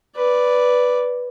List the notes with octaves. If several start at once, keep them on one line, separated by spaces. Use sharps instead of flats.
B4 D5